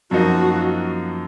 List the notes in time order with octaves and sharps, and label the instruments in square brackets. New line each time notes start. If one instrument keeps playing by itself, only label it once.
[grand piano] F#2 F3 A#3 D#4 [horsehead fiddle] F#4